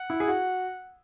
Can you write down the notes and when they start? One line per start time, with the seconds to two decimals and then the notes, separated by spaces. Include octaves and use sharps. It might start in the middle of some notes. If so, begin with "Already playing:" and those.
Already playing: F#5
0.10 E4
0.20 G#4
0.28 F#4